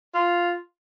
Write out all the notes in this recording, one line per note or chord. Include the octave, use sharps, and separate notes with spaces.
F4